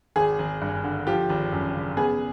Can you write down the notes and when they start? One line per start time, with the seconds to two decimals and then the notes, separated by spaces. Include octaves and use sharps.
0.16 G#1 G#4
0.39 G#1
0.61 G2
0.84 D3
1.07 F3 G4
1.30 G#1
1.52 F#2
1.74 C#3
1.97 B3 G#4